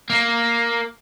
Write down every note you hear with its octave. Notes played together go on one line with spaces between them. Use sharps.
A#3